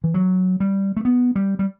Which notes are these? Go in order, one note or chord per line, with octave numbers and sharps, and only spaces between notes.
E3
F#3
G3
A3
B3
G3
G3